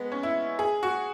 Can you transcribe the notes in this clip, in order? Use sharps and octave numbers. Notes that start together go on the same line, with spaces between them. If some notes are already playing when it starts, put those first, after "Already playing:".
Already playing: G#3 B3
C#4
E4
G#4
F#4